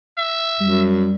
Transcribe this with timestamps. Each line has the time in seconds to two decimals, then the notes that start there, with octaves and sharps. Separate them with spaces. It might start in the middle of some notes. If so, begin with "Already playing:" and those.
0.18 E5
0.60 F#2 G3